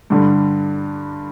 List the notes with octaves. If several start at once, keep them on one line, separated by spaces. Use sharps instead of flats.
G2 D3 G3